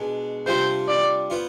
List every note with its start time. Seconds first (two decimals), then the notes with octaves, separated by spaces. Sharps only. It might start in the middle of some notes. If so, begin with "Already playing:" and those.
Already playing: B2 G#3 D4
0.46 C3 G3 D4 F4 C5
0.88 D5
1.30 B3 F4 C5